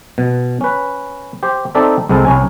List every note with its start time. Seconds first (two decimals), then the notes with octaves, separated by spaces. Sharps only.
0.18 B2
0.61 C#4 B4
1.43 G4 C5
1.75 C4 D#4 A4 D5 E5
2.09 C2 G#3 C4 A4
2.25 C2 C#4 G#5